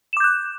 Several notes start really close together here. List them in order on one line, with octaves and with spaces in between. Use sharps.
E7 D6 G6 F#6